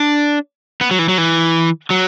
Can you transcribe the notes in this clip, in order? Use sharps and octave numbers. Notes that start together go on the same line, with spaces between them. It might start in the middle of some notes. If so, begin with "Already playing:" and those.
Already playing: D4
B3
F#3
E3
F#3
E3
F#3